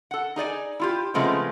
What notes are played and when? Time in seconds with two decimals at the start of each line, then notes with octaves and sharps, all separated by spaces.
0.11 A4 F#5
0.36 D#4 G#4 D5 G#5
0.80 E4 F4 G4
1.14 C#3 F3 G#3 A3 B3 C4